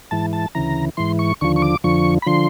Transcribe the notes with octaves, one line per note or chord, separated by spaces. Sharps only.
G#2 E3 A5
A5
D2 C#3 E3 A#5
G#2 E3 C6
C#6
D#2 D3 F3 C#6
C#6
D6
F2 D3 F3 C#6
B5
D3 F3 C6